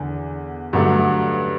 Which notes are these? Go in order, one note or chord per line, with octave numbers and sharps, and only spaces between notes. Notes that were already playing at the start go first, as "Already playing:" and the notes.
Already playing: E2 D3
G2 D3 F#3 A3